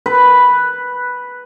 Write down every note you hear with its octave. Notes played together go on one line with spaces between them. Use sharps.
B4